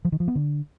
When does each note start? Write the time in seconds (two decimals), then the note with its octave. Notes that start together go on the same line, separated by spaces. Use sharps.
0.05 F3
0.12 D#3
0.20 F3
0.28 B3
0.35 D3